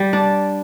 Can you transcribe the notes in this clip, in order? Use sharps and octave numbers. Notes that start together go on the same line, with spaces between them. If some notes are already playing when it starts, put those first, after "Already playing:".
Already playing: G3
D4